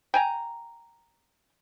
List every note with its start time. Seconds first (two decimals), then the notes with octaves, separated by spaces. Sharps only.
0.14 G5 G#5 A#5